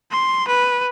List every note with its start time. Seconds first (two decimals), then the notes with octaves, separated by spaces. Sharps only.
0.11 C6
0.48 B4